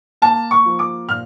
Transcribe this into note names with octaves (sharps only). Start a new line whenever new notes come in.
A#3 A5
C#6
F3
D6
A#2 F6